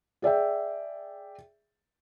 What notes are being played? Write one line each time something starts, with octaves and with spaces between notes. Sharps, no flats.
G#4 D5 E5 G5